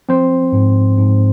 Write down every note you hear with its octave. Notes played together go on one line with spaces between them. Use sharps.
F3 C4 C5
G#2
G#2